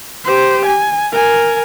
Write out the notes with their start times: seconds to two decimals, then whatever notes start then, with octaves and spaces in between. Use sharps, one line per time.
0.24 G4 C5
0.66 G#5
1.12 A#4 G#5